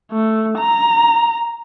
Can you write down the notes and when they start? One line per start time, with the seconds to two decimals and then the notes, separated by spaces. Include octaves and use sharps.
0.12 A3
0.58 A#5